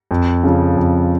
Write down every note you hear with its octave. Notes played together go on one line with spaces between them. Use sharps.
F2
C#3 F3
F2